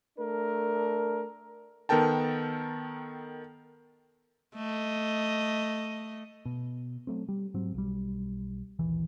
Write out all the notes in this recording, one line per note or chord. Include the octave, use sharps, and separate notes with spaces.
A3 D4 A#4
D#3 B3 A4 A#4 G5 A5
A3 D#5
B2
F#3 A3 C4
G3
G#2 F#3 C4
B1 G3
A#1 D#2 E3